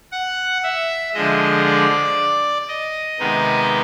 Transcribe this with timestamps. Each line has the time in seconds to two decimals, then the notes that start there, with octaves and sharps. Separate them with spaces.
0.11 F#5
0.63 E5
1.14 D3 F3 G#3 D#5
1.65 D5
2.68 D#5
3.19 C3 D#3 G#3 B3 D#4